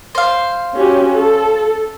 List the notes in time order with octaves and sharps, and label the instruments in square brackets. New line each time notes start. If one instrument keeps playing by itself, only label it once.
[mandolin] C5 F5
[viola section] C#4 F#4 G4
A4